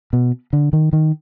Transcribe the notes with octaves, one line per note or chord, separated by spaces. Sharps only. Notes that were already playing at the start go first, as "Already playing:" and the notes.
B2
D3
D#3
D#3